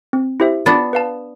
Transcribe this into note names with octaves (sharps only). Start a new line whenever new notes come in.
C4
E4 G4 C5 E5
B3 D4 F4
B4 F5 A5